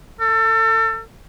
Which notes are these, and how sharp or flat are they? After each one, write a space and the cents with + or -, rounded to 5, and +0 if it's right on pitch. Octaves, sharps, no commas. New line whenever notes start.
A4 +30